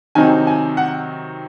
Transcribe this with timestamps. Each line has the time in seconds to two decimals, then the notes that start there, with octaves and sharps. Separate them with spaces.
0.15 C3 D#3 F#3 C4 D#4 G#5
0.47 G#5
0.77 F#5